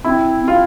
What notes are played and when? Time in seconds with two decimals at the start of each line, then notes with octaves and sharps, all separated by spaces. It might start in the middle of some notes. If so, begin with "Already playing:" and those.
0.05 C4 E4
0.42 C4
0.48 F4